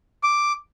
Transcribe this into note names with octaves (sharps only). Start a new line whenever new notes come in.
D6